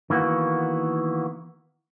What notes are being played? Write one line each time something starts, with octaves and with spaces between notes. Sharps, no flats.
D#3 E3 A#3 B3 F#4